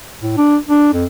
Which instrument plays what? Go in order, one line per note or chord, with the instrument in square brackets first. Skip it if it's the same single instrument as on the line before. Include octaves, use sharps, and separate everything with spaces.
[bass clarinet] A2
D4
D4
F2